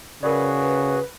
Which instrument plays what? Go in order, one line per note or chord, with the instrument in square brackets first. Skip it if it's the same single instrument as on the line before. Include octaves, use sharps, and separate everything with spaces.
[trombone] C#3 [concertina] F#4 G#4 [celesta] A#4 D5 [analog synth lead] B4